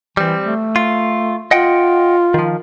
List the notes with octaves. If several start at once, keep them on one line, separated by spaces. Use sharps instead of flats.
E3 G3 C4
A3
F4
F4 D#5 F#5 G5
D#3 F3